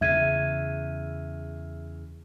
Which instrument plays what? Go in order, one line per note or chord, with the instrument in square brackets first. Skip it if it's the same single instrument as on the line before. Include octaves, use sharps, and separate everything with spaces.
[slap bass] E2 C#3 [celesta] E5 G#6 D#7